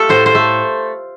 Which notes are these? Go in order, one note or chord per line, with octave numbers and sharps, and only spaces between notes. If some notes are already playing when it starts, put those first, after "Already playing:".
Already playing: A3 F4 G4 A4
A2 C5
C5
A3